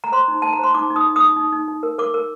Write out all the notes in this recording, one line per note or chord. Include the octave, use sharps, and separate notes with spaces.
A#5
C5 C6
D#4
D#4 A5
A#5
C5 C6
D#4 D6
D#4
D#6
D#4
D#6
D#4
D#4
D#4
D#4
A#4
A#4 D6
A#4